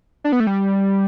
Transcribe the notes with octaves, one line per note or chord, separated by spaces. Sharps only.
D4
B3
A3
G3